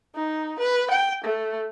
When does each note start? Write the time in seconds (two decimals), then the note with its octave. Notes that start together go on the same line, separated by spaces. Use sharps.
0.15 D#4
0.59 B4
0.91 G5
1.24 A3